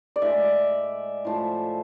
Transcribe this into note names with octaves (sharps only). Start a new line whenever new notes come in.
D5
A2 G#3 E5
A2 F3 A3